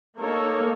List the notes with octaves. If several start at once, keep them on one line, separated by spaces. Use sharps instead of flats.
A#3 D#4 A4 C#5